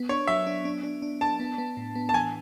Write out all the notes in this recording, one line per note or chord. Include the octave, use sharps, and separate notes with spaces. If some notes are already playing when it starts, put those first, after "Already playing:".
Already playing: B3
D4 C#5
F#3 E5
D4
D4
D4
D4
D4 A5
B3
B3
A2
B3
A5
E3 G#5